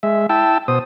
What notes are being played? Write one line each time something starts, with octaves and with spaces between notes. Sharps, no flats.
G#3 E5
E4 G5 A5 E6
B2 C5 D#6